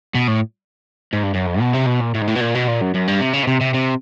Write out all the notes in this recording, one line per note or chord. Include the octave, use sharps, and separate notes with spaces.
B2
A2
G#2
G2
F#2
F2
B2
C3
B2
A#2
A2
G#2
A2
B2
A#2
B2
A#2
F#2
F#2
G2
C3
C#3
B2
C3
C3
C3